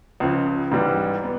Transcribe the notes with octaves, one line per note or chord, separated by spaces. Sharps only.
C#2 C#3 F3
G#2 E3 G3
B3